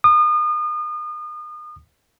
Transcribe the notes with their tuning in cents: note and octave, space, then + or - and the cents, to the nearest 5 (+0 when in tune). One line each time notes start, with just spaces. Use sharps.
D#6 -35